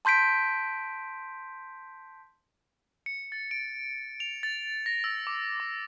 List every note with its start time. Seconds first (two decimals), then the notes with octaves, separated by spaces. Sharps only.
0.05 A5 C6 G6 B6 D7
3.06 C#7
3.32 A6
3.51 D7
4.20 F7
4.43 A6
4.86 A#6
5.04 E6
5.27 D6
5.60 D6